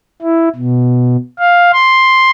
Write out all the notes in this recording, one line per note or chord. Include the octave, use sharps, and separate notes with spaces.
E4
B2
F5
C6